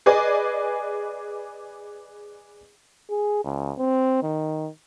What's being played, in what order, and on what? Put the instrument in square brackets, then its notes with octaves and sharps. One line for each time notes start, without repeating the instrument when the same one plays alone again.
[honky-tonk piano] G#4 B4 D5 D#5 G#5
[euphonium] G#4
C#2
C4
D#3